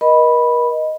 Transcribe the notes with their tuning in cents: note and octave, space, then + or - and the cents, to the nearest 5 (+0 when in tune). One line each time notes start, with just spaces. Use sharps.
A#4 +45 D#5 +0 B5 -5